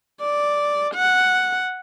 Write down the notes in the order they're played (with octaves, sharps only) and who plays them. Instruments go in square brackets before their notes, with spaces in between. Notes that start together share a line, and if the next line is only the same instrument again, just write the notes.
[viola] D5
F#5